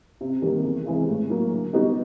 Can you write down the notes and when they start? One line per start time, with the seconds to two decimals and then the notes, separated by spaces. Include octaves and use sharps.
0.21 C3
0.42 D#3 G3 A#3
0.64 E2
0.85 C3 E3 G#3
1.09 A2
1.30 F#3 A#3
1.52 D3
1.73 G3 B3 D#4 F#4